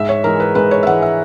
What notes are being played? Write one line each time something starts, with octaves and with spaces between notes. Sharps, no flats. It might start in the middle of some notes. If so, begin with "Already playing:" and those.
Already playing: G#2 E5
C#5
E3 G#3 A#4
B4
G#2 B4
C#5
E5
E3 G#3 F#5
E5